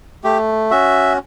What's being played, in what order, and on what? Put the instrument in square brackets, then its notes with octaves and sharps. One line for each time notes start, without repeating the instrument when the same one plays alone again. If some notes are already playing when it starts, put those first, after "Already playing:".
[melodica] A3 G4
C#4 F#4 E5